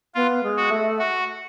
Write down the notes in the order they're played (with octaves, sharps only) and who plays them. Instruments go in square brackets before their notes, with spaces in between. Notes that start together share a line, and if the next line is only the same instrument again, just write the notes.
[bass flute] B3 [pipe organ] F4
[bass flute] G#3
[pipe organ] F#4
[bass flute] A3
[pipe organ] F#4